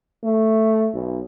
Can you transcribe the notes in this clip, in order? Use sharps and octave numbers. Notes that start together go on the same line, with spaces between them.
A3
B1